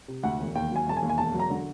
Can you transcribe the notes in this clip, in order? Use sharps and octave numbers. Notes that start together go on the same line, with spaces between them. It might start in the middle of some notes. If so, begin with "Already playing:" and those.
C3
D2 F#5
E1
D#2 G5
F#3 G#5
E1 A5
G#5
D#2
G#5
E1 A5
F#3
A#5
D3